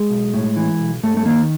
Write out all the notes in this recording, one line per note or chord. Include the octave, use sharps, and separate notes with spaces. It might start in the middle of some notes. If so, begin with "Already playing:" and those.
Already playing: G#3
B1
A2
E3
B1
G2 A3
A3
D#3 A#3